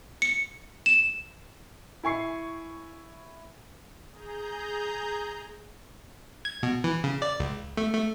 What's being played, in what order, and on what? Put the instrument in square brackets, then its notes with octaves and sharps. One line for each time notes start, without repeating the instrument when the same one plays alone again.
[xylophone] C#7
E7
[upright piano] E4 G#5 C#6 C7
[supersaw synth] G#4 A#5 G6
[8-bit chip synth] G#6
B2
E3
C#3
D5
C#2
A3
A3